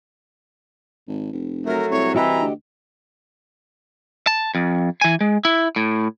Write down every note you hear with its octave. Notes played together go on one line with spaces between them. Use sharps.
G#1
F1
F#3 A3 A#4
C2 C#5
E3 F#4 G4 D#5 E5 A#5
D2
A5
F2
E3 G#5
G#3
E4
A2